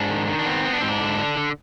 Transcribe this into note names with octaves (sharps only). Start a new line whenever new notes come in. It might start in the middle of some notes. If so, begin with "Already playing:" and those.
Already playing: G#2 D4
D#3
D#3
D4
B3 C4
B3
D4
G#2 C4
D4
D3
D3
D3